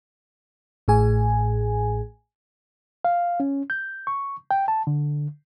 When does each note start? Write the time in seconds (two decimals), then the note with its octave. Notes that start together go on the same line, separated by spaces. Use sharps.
0.88 A1 A2 G#4 G#5
3.05 F5
3.40 C#4
3.70 G6
4.07 C#6
4.51 G5
4.68 A5
4.87 D3